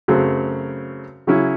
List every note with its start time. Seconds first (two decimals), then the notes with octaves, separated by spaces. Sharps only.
0.08 F#2 C#3 F#3 A3 C4
1.27 C#3 F#3 C#4 E4